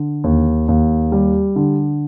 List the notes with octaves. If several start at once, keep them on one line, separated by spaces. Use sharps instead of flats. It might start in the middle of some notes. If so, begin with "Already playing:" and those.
Already playing: D3
D#2
D#2
G3
D3